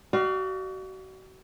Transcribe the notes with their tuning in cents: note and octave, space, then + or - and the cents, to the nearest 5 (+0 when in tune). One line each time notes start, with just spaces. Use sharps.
F#4 +35 D5 +45 F5 +0